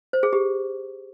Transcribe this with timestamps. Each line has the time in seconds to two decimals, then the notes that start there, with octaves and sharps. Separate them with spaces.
0.13 C5
0.23 G#4
0.33 G4